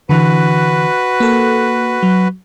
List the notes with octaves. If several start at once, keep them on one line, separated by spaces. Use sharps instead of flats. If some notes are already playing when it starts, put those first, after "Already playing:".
D3 E3 F#4 B4
A#3 A4
F#3